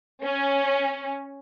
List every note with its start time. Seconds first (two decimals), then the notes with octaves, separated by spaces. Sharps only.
0.22 C#4